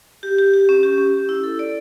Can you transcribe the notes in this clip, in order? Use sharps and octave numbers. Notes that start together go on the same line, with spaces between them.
G4
G4
G4
C#4
G4
C#4
G4
E4
A4
D5